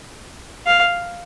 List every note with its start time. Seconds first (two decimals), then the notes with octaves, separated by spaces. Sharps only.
0.67 F5